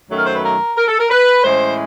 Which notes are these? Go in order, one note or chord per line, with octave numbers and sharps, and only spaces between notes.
F#2 D#3 F#3 A3
A#4
C5
B4
A#4
A#4
A4
A#4
B4
A2 E3 G#3 C#4 C5